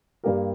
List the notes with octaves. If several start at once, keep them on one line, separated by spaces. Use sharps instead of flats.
G2 G3 A#3 G4 A#4